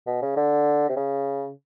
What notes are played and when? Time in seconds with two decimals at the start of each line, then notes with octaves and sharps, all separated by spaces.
0.07 B2
0.22 C#3
0.37 D3
0.89 C3
0.96 C#3